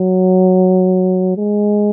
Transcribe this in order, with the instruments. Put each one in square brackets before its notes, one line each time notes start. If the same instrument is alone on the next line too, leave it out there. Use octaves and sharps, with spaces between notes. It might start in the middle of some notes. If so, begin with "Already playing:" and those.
Already playing: [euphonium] F#3
G#3